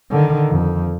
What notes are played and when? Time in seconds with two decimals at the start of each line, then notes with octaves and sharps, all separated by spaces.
0.10 D3 D#3
0.49 F2